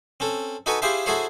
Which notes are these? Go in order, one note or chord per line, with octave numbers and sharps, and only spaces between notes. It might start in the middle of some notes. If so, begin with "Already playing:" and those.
C4 C#4 A4
D#4 F#4 A4 B4 G#5 C#6
E4 F4 G4 G#4 C5 E5
E4 F#4 G#4 A4 C5 C#5